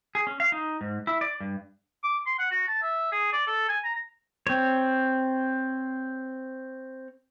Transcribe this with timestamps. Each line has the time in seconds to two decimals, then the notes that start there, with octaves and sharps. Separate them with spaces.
0.15 G#4
0.27 C#4
0.40 F5
0.52 D#4
0.81 G#2
1.07 E4
1.21 D5
1.41 G2
2.03 D6
2.26 C6
2.39 F#5
2.51 F#4
2.67 A5
2.82 E5
3.12 G#4
3.32 D5
3.47 A4
3.69 G#5
3.84 A#5
4.47 C4 C#5